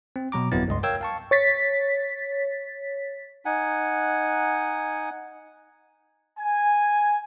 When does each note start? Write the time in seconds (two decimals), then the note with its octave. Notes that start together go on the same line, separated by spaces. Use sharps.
0.16 C4
0.32 B2 F#3 A#5 D6
0.52 G1 F2 F#3 B3 E4 A6
0.68 C#2 G2 D#5 C6
0.83 A#4 C#5 F5 G5 E6 G#6
1.01 F5 A5 C#6
1.31 C#5 A6 B6
3.45 D#4 F#5 G#5
6.38 G#5